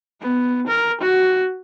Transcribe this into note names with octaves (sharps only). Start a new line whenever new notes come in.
B3
A#4
F#4